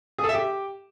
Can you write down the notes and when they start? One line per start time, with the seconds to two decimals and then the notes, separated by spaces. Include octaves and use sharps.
0.18 G#4
0.24 A4
0.29 E5
0.34 G4